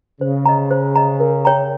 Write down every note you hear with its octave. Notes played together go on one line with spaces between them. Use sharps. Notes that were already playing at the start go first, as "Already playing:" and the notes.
C#3 C5
D#5 A#5
C5
D#5 A#5
A#4
C#5 G5 A#5